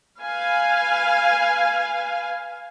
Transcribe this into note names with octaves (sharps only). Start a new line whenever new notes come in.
B4 F5 G#5